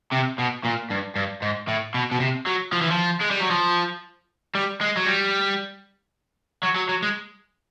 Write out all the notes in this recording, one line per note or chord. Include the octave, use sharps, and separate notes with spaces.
C3
B2
A#2
G2
G2
G#2
A2
B2
B2
C3
F#3
F3
E3
F3
G#3
G3
F#3
F3
G3
G#3
F#3
G3
F#3
F#3
F#3
G#3